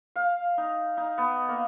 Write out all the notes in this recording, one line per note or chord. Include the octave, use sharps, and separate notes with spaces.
F5
D#4
D#4
B3
A#3